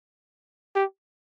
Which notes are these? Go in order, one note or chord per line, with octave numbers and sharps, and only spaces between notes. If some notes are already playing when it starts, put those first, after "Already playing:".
G4